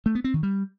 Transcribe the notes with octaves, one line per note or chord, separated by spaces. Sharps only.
A3
B3
C4
D#3
G3